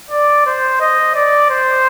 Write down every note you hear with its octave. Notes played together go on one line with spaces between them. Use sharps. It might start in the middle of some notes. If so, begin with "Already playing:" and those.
D5
C5
D#5
D5
C5